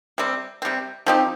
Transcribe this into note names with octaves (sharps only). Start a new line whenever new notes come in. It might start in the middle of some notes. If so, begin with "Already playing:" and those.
C3 G3 C4
C3 G3 C4
F3 C4 D#4 G4